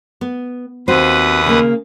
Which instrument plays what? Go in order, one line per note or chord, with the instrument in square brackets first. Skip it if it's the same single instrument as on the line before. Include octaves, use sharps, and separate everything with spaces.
[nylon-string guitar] B3
[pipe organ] D#2 B4 D#6 [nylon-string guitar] C4 F#4 C5
[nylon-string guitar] C#3 A#3